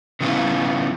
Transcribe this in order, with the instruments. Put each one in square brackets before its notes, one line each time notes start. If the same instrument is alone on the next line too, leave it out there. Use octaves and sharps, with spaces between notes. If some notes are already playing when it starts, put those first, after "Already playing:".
[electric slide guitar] C#3 F3 B3 C#4 E4 F4